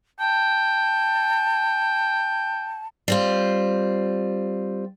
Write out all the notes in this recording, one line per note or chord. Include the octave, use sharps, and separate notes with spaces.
G5 A5
G3 C4 F4